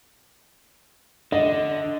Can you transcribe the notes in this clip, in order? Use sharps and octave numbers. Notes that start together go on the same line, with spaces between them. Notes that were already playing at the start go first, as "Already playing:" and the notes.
D3 D#5